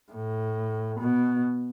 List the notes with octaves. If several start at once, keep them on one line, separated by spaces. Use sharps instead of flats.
A2
B2